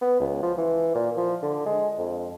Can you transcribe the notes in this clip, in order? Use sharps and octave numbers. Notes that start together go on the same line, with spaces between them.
B3
C#2
F3
E3
A#2
F3
D3
G#3
F2